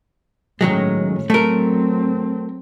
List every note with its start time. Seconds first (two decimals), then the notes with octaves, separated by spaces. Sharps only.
0.61 A2 D#3 F#3 G#3 C#4
1.30 F#3 A3 C4 A#4